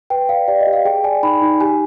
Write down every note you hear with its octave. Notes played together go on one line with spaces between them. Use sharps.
B4 G5
D5 F5
G4 D5
D#5
G4
F5
G#4 G5
D5 G#5
D#4 B5
D#4
G4 G#5